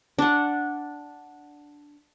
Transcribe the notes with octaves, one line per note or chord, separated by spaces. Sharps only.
D4 F#5